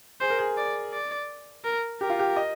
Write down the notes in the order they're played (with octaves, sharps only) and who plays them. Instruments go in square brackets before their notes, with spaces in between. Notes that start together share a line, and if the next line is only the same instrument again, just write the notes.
[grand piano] G#4 [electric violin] C5
[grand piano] A#4
G#4
[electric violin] D5
D5
A#4
[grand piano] G4 [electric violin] A#4
[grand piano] F4
G4
D#5